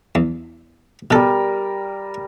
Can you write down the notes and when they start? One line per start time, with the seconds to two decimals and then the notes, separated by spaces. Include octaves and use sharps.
0.15 E2
1.11 B2 G3 A4 A#4